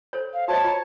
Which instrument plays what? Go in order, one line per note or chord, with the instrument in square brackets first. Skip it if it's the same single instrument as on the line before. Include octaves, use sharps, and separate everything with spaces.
[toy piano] A4 C5 C#5
[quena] F5
[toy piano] F#4 C5 D#5 [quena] C#5 [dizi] A5
[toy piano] F4 A#5